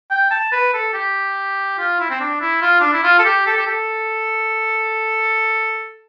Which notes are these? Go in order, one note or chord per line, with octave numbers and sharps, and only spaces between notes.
G5
A5
B4
A4
G4
F4
E4
C4
D4
E4
F4
D4
E4
F4
A4
G4
A4
G4
A4